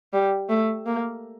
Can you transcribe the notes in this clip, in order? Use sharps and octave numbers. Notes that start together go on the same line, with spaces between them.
G3
A3
A#3